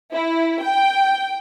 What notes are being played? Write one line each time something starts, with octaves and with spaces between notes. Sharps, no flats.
E4
G5